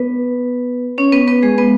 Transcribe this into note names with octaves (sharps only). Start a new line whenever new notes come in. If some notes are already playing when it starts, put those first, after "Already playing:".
Already playing: B3 B4
C#4 C#5
B3 B4
B3 B4
G#3 G#4
B3 B4